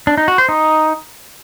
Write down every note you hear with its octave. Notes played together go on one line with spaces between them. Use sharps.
D4
D#4
F#4
C5
D#4